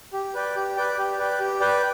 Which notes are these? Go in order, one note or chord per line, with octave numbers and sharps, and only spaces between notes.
G4
B4 D5 G5
G4
B4 D5 G5
G4
B4 D5 G5
G4
B4 D5 G5